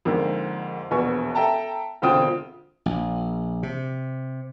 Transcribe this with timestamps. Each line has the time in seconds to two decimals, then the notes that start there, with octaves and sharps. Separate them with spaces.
0.05 F2 G#2 D3 A#3
0.91 E1 A#1 B3 G#5 C#6
1.35 A4 E5 G5 A5 A#5
2.02 E1 D3 C4 F4 G5 D#6
2.86 A#1
3.63 C3